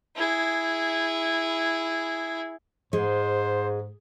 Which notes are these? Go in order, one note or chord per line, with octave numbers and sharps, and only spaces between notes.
E4 G#4
G#2 G#3 C5